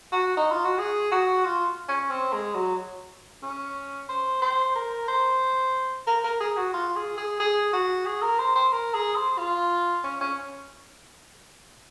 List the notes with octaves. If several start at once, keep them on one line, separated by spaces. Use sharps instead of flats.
F#4
D#4
F4
F#4
G#4
F#4
F4
C#4
C4
G#3
F#3
C#4
C5
C5
A#4
C5
A#4
A#4
G#4
F#4
F4
G#4
G#4
G#4
F#4
G#4
A#4
C5
C5
A#4
G#4
C5
F4
C#4
C#4